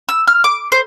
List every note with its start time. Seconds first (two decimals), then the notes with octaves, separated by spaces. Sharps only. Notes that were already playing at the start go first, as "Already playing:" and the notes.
0.09 E6
0.27 F6
0.44 D6
0.72 C5